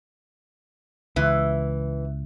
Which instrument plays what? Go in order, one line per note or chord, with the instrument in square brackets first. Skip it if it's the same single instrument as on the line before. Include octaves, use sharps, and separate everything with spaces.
[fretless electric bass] C#2 [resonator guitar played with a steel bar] E3